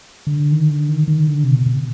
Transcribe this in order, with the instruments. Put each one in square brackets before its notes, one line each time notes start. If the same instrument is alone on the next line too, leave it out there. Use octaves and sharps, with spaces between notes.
[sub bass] D3
D#3
D3
D#3
D#3
D3
C3
B2
B2